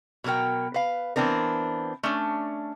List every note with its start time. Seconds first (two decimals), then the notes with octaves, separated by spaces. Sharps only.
0.24 B2 F#3 A#3 A#4 G5
0.74 B4 F5
1.16 E3 B3 C4 D4 A#4
2.03 A3 C#4 D4